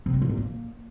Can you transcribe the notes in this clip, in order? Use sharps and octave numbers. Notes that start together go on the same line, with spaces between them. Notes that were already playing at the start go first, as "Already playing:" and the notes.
C3
G#3
A2
A#2
A#3